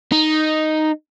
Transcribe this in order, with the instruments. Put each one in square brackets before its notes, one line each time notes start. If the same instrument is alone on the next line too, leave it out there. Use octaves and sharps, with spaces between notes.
[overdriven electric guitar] D#4